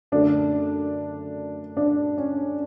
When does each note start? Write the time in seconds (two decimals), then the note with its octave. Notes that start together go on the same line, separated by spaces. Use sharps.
0.12 F#2 D3 A3 D4
1.77 D4
2.18 C#4